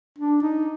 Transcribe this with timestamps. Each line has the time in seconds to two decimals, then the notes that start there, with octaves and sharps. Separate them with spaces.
0.19 D4
0.42 D#4